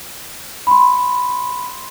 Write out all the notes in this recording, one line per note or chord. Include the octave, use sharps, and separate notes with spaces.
B5 C6